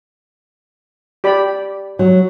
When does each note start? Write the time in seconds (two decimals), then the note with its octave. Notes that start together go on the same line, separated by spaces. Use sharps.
1.24 G4 D5 B5
1.99 F#3